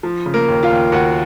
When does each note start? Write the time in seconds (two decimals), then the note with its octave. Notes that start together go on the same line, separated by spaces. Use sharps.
0.03 F3
0.26 C#3
0.34 A#3 A#4
0.48 D#2
0.63 F4 F5
0.70 D#2
0.92 D#2 F#4 F#5